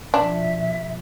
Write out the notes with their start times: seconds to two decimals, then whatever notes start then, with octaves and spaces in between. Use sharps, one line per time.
0.14 B2 F3 D4 E5